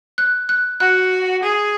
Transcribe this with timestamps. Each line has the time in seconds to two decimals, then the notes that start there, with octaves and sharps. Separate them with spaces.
0.18 F#6
0.49 F#6
0.80 F#4 F#6
1.43 G#4